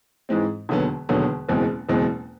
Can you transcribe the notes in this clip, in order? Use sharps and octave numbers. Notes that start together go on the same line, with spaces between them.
G#2 E3 G#3 C4
E1 D#2 D3 F#3 B3
E1 D#2 D3 F#3 B3
F#1 E2 B2 G#3 C4
F#1 E2 B2 G#3 C4